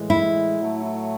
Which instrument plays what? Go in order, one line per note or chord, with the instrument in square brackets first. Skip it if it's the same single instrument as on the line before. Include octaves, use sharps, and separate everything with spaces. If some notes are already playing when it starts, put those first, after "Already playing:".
Already playing: [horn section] A2 E3 G#3
[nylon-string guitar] E4
[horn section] A2 F#3 A3